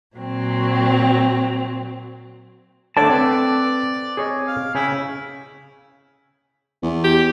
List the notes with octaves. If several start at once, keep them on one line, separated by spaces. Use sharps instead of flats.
A#2 F#3 C4
D3 A3 C#5 D5 A5 D6
C4 A4 B4 D5
G#4 C#5 D#5
F5
C#3 E4 G5 G#5
E2
G4